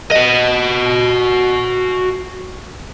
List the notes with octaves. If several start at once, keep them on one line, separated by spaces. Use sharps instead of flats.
F#4 D#5